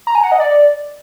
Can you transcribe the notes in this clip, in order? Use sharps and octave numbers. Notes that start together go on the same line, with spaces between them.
A#5
G#5
F#5
D#5
D5